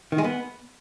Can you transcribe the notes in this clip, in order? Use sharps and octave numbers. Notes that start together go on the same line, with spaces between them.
D#3
G#3
B3